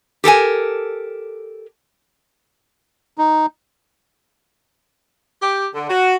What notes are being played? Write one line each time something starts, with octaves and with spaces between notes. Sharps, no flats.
G4 A4 A#4 G#5
D#4
G4
D3
F#4